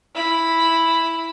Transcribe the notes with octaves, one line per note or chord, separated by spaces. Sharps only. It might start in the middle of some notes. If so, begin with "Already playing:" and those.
E4 B5